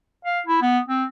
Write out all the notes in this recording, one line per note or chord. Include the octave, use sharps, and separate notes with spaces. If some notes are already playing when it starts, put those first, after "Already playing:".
F5
E4
B3
C4